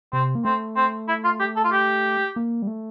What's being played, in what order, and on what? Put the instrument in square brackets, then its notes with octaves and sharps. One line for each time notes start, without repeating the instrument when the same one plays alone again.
[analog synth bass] C3 [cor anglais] C4
[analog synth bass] A#3
[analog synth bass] A3 [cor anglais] C4
[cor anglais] C4
E4
F4
G4
A4
F4
G4
[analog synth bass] A#3
G3
A3